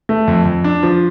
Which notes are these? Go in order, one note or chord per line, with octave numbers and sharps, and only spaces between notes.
A3
F2
F2
D4
F3